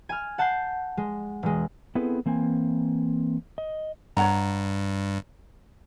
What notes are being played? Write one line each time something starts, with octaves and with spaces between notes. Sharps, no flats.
G#5 F6
F#5 A5 F#6 G6 C7
G#3
E1 G#3
B3 C4 E4 G#4 A4 B4
E3 A#3 C4 G#5
D#5
G2 C#5 F#5 A#5